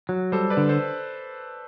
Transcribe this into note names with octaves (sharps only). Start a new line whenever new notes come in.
F#3
G3 A4 C5
B4 D5
D3
A4 C5